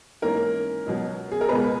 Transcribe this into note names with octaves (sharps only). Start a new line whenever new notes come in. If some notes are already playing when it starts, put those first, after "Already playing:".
G#2 E3 A#3 C#4 A#4
C#2 B2 F#3
G#4
A#4
C#2 B2 G#3 B3 G#4 B4